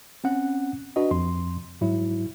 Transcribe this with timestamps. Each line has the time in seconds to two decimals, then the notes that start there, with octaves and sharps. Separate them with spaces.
0.24 C4 C#4 F#5 F#6
0.96 D4 F#4 B4 D#5
1.11 F2 C6
1.81 G#2 F#3 E4